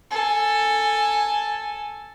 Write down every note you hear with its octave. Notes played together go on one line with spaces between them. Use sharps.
A4 G#5